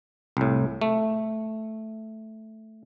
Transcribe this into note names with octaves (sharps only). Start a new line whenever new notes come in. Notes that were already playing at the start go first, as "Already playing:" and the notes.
C2 A2
A3